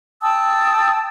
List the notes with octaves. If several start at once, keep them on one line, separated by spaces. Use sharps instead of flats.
G5 A5 D#6 E6